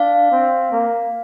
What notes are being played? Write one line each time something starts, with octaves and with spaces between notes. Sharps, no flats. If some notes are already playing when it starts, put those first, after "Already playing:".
Already playing: D4 F5
C4
A#3